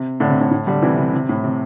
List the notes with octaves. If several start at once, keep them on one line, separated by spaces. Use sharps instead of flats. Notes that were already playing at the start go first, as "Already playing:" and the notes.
Already playing: C3
A2 D3
C3
A2
A2
D3 G3
C3 E3
C3
C3
A2
C3